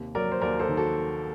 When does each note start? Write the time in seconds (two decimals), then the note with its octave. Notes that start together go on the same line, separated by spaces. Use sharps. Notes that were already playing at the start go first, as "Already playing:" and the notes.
Already playing: D#2 C3
0.15 F#3 A#4 D5
0.32 C5
0.42 D#2 A#4 D5
0.59 A4 C5
0.69 D#3
0.77 F#4 A4